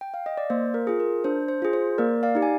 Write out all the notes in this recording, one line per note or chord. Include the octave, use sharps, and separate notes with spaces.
G5
F5
D#5
D5
A#3 C5
A#4
F4 G#4
A#4
D4 C5
C5
F4 G#4
C5
A#3 A#4 D5
D5 F5
D#4 G4
G#5